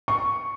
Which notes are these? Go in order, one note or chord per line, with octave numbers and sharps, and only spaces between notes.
C#6